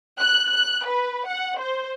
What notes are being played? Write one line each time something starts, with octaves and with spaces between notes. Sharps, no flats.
F#6
F#6
B4
F#5
C5